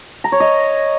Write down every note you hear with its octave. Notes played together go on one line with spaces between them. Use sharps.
A#5
C#5
D#5